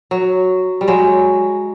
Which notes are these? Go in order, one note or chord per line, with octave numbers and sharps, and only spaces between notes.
F#3
G3
F#3 G#3